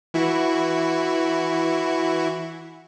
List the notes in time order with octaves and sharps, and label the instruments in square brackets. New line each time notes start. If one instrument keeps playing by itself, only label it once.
[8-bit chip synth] E3 E4 F#4